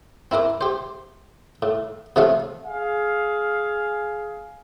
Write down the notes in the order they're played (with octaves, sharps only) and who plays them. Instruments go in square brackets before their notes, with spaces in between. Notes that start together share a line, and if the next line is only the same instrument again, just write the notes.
[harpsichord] C4 E4 A#4 D6
G4 C5
A2
C3 F3 A3 C#4 C#5 F5
[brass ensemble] G#4 F5